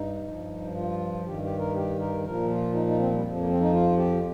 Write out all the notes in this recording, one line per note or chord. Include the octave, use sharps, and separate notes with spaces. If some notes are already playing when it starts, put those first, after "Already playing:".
Already playing: G2 D#4
G2 F3
F4
G2 D#3 G4
G4
A#4
G4
A#4
A#2 F3 A#4
F4
D#4
D#4
C4
G3
F2 F3
A#3
C4
D#4
F4
G4